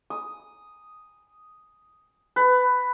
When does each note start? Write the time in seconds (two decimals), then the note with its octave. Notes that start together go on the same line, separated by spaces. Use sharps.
0.10 D#6
2.36 B4